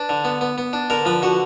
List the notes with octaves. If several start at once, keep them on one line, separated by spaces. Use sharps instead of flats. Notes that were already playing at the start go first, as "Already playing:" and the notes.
Already playing: D4 B4
D3
B3
B3
B3
D4
D3 A#4
F3 B4
D3 F#4